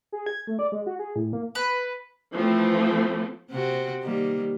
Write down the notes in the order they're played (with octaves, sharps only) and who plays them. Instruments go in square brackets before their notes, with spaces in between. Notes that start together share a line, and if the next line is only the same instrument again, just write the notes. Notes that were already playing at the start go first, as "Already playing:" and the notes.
[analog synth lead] G#4
G#6
A3
D5
G#3
F#4
G#4
A2
A#3
[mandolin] B4
[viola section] E3 F3 A3 C4
[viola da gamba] C3 C4 F#4
D#3 G3 A#3